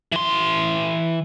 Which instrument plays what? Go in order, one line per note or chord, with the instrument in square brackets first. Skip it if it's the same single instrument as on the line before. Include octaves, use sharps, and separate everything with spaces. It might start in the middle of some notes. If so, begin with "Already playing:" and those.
[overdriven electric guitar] E3 C6